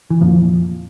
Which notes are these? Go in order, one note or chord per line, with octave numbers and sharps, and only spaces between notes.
E3
F2 A#2 F3